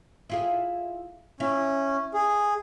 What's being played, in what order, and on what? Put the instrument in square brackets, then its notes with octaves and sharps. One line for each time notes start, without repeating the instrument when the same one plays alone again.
[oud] E4 F4 G#4
[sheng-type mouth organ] C#4 [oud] E4
[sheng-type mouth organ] G#4